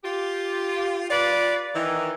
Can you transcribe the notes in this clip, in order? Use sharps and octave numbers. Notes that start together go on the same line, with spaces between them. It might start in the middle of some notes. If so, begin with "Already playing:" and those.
F4 G4
F4 B4 D5
D#3 E3